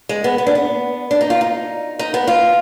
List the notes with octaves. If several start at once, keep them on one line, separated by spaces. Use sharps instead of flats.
G#3
B3
B3
D4
B3
D4
D#4
F4
D#4
D#4
B3
F4